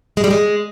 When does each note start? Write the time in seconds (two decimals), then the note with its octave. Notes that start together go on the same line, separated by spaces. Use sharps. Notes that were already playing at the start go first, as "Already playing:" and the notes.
0.17 G#3
0.24 G3
0.31 G#3